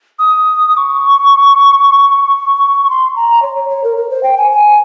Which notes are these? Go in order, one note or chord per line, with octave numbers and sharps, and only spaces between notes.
D#6
D#6
C#6
C6
A#5
C#5
C#5
C#5
A#4
A#4
C5
G5
G#5
G#5